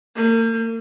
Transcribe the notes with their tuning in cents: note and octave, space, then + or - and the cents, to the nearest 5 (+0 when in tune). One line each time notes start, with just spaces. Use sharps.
A#3 -40